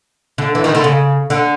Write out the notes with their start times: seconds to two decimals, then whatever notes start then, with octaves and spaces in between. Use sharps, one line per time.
0.38 D3
0.55 E3
0.64 D#3
0.75 D3
0.84 C#3
1.30 D3